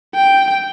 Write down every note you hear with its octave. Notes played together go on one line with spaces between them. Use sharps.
G5